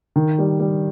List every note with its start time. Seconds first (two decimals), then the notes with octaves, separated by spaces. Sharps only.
0.16 D#3
0.38 G3
0.60 G3